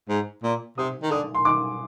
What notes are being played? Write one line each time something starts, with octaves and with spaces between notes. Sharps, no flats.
G#2
A#2
C3 D#6
D#3
D3 D#6
C6
D#3 D6